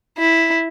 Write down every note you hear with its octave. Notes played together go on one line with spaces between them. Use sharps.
E4